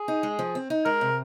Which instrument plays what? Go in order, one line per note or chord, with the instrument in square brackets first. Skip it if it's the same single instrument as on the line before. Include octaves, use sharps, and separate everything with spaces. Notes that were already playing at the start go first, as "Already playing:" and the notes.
Already playing: [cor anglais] G#4
[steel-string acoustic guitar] D#4
G#3
F3
C4
D#4
[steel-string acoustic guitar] G#3 [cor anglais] A#4
[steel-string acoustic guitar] C3